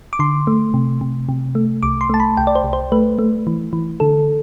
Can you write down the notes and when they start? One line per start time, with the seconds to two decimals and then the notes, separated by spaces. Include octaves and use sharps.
0.13 D6
0.19 D3 C6
0.47 A3
0.74 C3
1.01 C3
1.29 C3
1.55 A3
1.83 C2 D6
2.01 C6
2.10 A3 A5
2.20 B5
2.37 C2 G5
2.47 D5
2.55 C5
2.64 C2
2.73 C5
2.92 A3 B4
3.19 A3
3.47 E3
3.73 E3
4.00 D3 A4